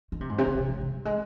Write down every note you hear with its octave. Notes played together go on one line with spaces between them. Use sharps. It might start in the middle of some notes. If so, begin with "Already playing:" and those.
D#3
C3
G#2
C3
C#3
C3
G#2
C3
G3
G#3